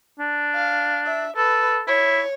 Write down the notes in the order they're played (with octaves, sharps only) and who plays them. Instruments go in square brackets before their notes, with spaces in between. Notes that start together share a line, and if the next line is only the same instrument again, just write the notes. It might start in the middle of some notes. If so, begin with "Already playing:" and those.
[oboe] D4
[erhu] F5
E5
[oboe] A4 [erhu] B4
[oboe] E4 [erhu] C#5